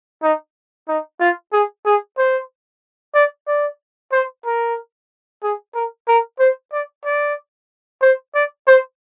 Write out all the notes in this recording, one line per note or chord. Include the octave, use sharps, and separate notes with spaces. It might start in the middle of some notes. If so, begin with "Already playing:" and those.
D#4
D#4
F4
G#4
G#4
C5
D5
D5
C5
A#4
G#4
A#4
A#4
C5
D5
D5
C5
D5
C5